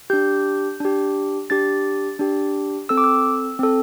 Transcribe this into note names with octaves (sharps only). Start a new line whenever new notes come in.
D4 G4 G6
D4 G4
D4 G4 A6
D4 G4
C4 A4 E6
D6
E6
C4 A4